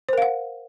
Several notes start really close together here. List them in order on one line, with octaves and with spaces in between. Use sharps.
C5 A#4 F5 F#5